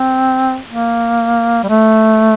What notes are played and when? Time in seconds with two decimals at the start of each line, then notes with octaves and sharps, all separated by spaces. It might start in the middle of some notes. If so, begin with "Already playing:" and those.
Already playing: C4
0.69 A#3
1.63 G3
1.68 A3